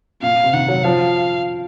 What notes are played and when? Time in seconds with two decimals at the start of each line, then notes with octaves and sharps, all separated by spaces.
0.22 A#2 F5
0.44 C3
0.53 D#3 F#5
0.68 F#3
0.84 F3 F5